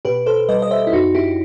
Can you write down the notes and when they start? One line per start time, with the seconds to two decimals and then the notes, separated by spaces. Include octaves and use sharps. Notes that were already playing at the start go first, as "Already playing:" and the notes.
0.05 B2 G4 B4
0.26 A4 C5
0.49 G3 B4 D#5
0.62 D#5
0.71 C5 E5
0.87 E4
0.93 F#2 D#4 F#4
1.15 E4 G4